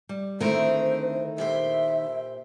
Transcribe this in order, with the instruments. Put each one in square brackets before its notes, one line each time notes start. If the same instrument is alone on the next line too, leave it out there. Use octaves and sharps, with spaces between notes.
[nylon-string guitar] G3
[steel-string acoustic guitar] D3 C4 A#4 [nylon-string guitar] D#3 A3 E4 [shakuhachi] C5
[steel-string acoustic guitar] A#2 G4 C5 [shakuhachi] E5